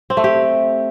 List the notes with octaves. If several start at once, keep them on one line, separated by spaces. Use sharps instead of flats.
C4
A3
G4